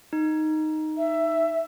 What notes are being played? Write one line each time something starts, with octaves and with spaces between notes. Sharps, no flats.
D#4
E5